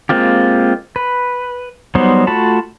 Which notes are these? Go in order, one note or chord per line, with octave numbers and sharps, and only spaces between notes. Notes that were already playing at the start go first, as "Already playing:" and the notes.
G#3 A#3 C4 F4 G4
B4
F#3 G3 B3 D#4 C5
A3 F4 F#4 A5 B5